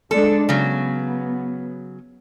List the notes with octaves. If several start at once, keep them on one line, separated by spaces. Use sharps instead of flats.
G#3 D4 A4
C#3 F#3 B3